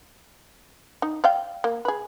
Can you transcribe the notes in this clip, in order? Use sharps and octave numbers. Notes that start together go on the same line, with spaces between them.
D#4
D5 F5 G5
A#3
G#4 B4